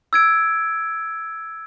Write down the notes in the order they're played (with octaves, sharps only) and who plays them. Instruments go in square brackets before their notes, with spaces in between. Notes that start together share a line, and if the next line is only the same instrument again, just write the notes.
[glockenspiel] E6 G#6 D7